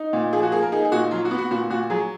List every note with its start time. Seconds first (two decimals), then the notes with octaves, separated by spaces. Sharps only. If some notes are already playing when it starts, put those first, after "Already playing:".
Already playing: D#4
0.13 A#2
0.33 F3 G#4
0.43 F#4
0.52 A#3 G#4
0.63 A#4
0.72 D#4 G#4
0.85 G#4
0.92 A#2 F#4
1.11 F#3 F4
1.25 F#4
1.31 B3
1.38 F#4
1.51 A#2 F#4
1.70 A#2 F#4
1.90 F#3 G#4